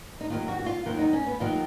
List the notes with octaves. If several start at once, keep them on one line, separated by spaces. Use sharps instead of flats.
D#4
D#2 D#3 F#3 F4
F#4
F#4
F4
D#2 D#3 F#3 F4
D#4
C#4
B3
D#2 D#3 F#3 F4